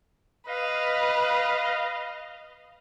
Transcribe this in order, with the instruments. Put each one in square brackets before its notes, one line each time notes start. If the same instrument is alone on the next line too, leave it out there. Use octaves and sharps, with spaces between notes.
[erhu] B4 [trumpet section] D#5 F5